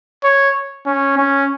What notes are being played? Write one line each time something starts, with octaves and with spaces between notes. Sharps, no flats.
C#5
C#4
C#4